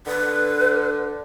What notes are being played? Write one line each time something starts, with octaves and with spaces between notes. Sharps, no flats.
D3 B4